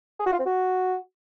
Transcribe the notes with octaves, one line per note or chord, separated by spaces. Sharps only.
G#4
F#4
F4
C4
F#4